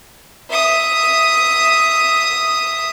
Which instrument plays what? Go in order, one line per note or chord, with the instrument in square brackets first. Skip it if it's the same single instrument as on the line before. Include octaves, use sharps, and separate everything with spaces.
[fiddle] E5 D#6